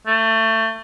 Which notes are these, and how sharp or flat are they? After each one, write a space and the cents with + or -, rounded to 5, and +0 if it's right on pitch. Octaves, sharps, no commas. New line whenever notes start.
A3 +25